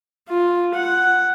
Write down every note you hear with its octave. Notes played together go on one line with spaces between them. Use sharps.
F4
F#5